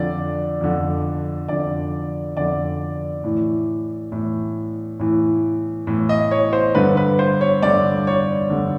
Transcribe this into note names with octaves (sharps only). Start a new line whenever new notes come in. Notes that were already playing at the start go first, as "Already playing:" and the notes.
Already playing: F2 D3 D5
F2 D3
F2 D3 D5
F2 D3 D5
A2 E3
A2 E3
A2 E3
A2 E3
D#5
C#5
C5
G2 D3 B4
B4
C5
C#5
G2 D3 D5
C#5
G2 D3